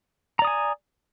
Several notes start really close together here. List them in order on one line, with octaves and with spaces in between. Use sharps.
A#5 D5 D#6 G#5